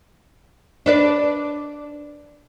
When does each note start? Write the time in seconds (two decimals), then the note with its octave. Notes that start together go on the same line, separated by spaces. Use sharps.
0.86 D4 B4 D5